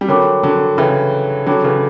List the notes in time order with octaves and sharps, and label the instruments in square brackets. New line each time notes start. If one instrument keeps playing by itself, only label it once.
[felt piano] G3
[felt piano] D3 F#3 [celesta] A#4 C#5 G5 B5 D6
[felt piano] D3 F#3
[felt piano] C#3 E3 [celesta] C#5 E5 G5 B5
[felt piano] D3 F#3 [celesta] C#5 G5 B5 D6
[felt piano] C#3 E3